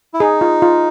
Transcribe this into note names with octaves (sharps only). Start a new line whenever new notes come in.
E4
D#4 G#4
F4
F4